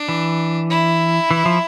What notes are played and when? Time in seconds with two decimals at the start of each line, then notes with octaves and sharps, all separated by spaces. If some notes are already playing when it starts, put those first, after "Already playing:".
Already playing: D4
0.09 E3
0.70 E4
1.31 E3
1.46 F3